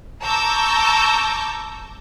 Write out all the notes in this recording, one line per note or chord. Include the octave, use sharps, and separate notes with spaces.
A5 A#5 C#6 D6 E6 G6